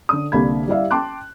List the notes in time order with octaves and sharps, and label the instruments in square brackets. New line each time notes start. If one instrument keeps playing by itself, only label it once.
[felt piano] D3 D#6
C2 D3 A#3 B5 G#6
G3 E4 G4 D5 E5 F5
G5 A5 C6 D6 F#6